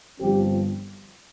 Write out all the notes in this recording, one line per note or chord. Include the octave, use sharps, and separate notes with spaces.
G1 G2 F3 C4 G4